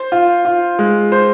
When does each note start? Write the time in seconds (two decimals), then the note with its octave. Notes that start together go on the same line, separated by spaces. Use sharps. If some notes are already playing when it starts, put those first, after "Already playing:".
Already playing: C5
0.12 F4
0.45 F4
0.79 G#3
1.12 C5